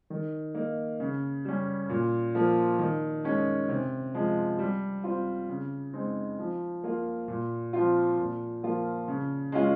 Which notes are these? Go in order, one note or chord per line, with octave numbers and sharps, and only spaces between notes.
D#3
A#3 D#4
C#3
G3 C#4
A#2
F3 A#3
D#3
G#3 C#4
C3
F3 G#3
G3
C4 F4
C#3
G#3 C4 D#4
F3
A#3 F4
A#2
F3 C4 F4
A#2
F3 A#3 F4
C#3
G#3 C#4 F4